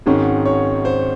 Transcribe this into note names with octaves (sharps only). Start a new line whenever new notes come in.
G#1 G#2 D#3 G#3 C#4
C#5
C5